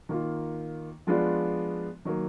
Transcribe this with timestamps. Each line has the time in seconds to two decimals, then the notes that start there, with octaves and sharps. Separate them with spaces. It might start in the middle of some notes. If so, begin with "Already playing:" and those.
0.09 D#3 A#3 F4
1.07 F3 G#3 B3 D4 F4
2.05 D#3 F#3 A#3